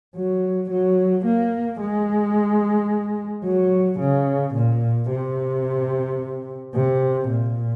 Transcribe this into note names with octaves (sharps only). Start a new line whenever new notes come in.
F#3
F#3
A#3
G#3
F#3
C#3
A#2
C3
C3
A#2